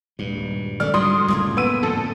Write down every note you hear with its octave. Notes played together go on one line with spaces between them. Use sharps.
D#1 G#1 G2
D#3 A3 C#4 D5 F6
G#2 D3 F#3 G3 F4 C6 D#6
F#1 C#2 F#2 A2 A#3
B3 E6 D#7
F2 A#2 D3 A4